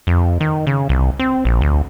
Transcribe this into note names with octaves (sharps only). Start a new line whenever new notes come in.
F2
D#3
C#3
C2
C4
A#1
D2